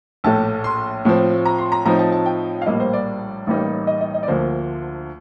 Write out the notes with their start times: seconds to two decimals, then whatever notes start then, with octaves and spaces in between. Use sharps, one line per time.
0.24 A#1 A2 A3 A5
0.64 C6
1.05 A2 F3 C4
1.46 A#5
1.58 C6
1.72 A#5
1.85 A2 F3 C4 D#4 A#5
1.99 A5
2.12 A5
2.26 G5
2.62 F5
2.66 A#1 A2 G3 A#3 D#5
2.80 C5
2.93 D5
3.47 A1 A2 G3 A#3 D#4
3.87 D#5
4.01 D#5
4.14 D#5
4.23 D5
4.28 D2 D3 F3 A#3 C5